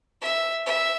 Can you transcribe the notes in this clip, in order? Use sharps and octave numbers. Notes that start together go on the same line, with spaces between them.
E5
E5